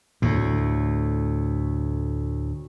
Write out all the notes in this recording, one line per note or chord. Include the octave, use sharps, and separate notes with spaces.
D2 A2